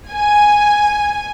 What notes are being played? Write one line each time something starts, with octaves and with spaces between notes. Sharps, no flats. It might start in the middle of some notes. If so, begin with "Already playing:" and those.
G#5